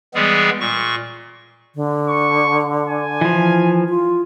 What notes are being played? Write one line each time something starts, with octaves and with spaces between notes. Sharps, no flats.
E3 G3 G#3 B3 G#4
A#2 C#6
D3
C#6
G#5
E3 F3
F4